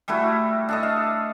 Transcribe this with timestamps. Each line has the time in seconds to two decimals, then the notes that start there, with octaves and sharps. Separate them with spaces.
0.08 G3 A3 E4 F#4
0.69 D4 A4 D#5
0.83 F5